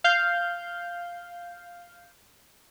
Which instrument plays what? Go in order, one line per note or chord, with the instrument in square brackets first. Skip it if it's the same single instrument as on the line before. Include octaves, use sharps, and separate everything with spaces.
[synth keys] F5 G6